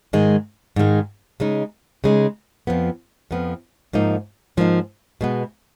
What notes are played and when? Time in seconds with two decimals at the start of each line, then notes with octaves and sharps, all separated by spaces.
0.13 G#2 D#3 G#3
0.76 G#2 D#3 G#3
1.40 C#3 G#3 D#4
2.04 C#3 G#3 D#4
2.67 F2 F3 B3
3.31 F2 F3 B3
3.93 G#2 F3 A#3 D#4
4.57 G#2 F3 A#3 D#4
5.21 B2 G#3 B3